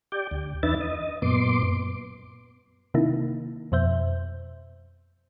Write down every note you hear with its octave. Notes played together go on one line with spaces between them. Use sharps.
G4 D5 G5
D2
E2 D4 D#4 B4 E5 A6
D#5
F#2 A#2 B3 C6 D6
C3 D#3 A#3 D#4 E4
F2 B2 C5 E5 G6